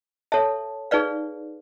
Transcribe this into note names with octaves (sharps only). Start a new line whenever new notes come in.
A4 C#5 E5 A5
D#4 G#4 B4 D5 F5